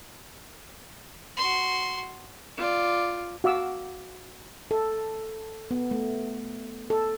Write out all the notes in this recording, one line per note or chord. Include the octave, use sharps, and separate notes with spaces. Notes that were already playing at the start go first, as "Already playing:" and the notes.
F#4 C6
F4 D5
F#4 F5 D6 E6
A4
B3
A3
A4